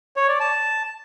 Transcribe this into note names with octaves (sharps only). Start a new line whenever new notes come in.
C#5
D5
A5